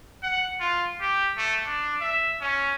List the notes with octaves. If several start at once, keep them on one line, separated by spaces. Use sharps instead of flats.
F#5
F4
G4
A3
D4
E5
C#4